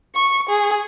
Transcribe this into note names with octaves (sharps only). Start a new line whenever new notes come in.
C#6
G#4